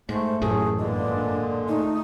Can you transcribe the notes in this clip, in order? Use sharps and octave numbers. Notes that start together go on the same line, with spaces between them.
G#2 A3 C5
A1 F#2 A2 A3 G#4
G2 A#2 D3 G#3 D4
A3 D#4